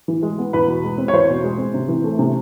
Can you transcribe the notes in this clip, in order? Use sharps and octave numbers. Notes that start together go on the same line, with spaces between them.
E3
G#3
B3
E2 B4
B2
G#3
C4
C#5
E2 C5
B2
G#3
C4
C3
E3
A3
C3